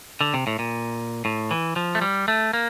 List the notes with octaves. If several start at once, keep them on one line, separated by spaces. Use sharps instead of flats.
D3
C3
A2
A#2
A2
E3
F3
A3
G3
A3
A#3